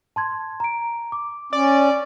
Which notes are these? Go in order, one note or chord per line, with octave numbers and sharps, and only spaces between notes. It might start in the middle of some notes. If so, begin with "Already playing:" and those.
A5 C6 G#6
A#5 D7
D6
C#4 D5